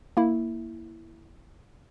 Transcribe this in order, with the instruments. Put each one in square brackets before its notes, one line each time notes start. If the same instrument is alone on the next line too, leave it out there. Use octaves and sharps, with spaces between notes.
[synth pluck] A#3 E4